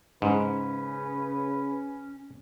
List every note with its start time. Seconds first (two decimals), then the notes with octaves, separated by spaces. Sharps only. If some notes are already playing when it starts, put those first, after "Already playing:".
0.22 G#2 C#3 C#4 B4